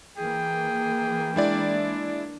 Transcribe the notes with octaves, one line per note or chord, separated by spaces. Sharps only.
E3 A#3 G#4 G5
G#3 D4 E4 D5